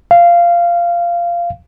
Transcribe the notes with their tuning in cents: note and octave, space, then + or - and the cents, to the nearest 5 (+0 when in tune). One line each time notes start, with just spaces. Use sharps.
F5 -15